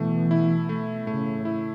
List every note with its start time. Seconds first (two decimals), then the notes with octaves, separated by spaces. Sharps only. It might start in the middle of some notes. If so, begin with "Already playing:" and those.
Already playing: B2 E3 A3
0.31 E4
0.69 A3
1.07 A2 C#3 A3
1.45 E4